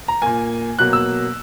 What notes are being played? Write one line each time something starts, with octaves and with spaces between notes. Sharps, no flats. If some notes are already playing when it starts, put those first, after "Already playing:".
A#5
A#2 A#3 G#5
B2 F#3 A#3 F#6
E6